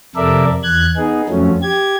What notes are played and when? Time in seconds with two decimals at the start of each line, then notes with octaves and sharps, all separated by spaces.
0.16 F2 C3 A4 A#4 D5 E5
0.64 E2 F#6 G#6
0.97 B3 D#4 G#4
1.29 F2 F3 F#3 A3 C#4
1.62 G4 G#6